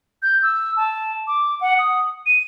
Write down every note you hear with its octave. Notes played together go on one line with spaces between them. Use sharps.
G6
E6
A5
D6
F#5
D#6
D#7